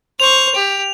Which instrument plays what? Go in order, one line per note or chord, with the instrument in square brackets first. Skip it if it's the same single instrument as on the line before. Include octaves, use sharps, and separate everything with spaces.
[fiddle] C5 C#6 [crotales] F7
[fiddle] G4